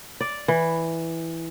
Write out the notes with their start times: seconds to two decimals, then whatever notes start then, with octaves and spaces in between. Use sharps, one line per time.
0.21 D5
0.48 E3